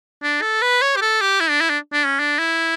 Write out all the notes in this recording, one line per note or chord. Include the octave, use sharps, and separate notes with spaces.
D4
A4
B4
C#5
G4
A4
G4
E4
D4
E4
D4
D4
C#4
D4
E4